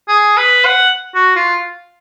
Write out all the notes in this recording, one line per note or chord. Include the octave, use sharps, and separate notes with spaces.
G#4
B4
F#5
F#4
F4